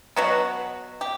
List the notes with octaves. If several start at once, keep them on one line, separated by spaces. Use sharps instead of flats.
B2 F#3 B3 F#4
G4